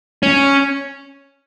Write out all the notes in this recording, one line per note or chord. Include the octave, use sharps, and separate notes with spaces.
C#4